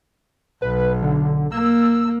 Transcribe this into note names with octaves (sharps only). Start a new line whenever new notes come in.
B1 B4
D3
A#3 E6